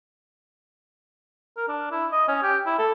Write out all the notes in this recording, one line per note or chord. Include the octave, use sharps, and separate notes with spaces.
A#4
D4
E4
D#5
C#4
G4
E4
A4